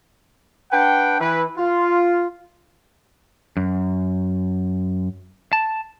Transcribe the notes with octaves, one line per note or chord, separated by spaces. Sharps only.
D4 B4 F#5 G5
E3 E4 B4
F4
F#2
A5